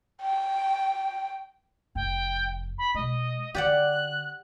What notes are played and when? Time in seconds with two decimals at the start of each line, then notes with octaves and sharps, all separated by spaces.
0.22 G5
1.95 F1 F2 G5
2.78 B5
2.95 B2 G#3 D#5
3.55 D3 G4 D5 F#5 F#6